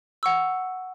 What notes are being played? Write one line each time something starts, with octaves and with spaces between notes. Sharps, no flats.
F#5 C#6 E6